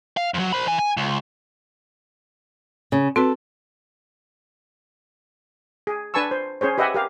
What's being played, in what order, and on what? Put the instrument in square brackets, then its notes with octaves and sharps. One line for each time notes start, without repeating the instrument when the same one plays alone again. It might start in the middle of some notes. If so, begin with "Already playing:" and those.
[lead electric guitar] F5
F2 F#3
C5 B5
E3 G#5
G#5
C#2
[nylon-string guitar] C#3
[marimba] C4 F#4 B4 [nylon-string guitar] A4
[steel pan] G#4
D4 B4 G#5 A5 C#6 E6
C5
C#4 G#4 C5 C#5
G4 B4 D#5 E5 F#5 G#5
G4 A#4 F5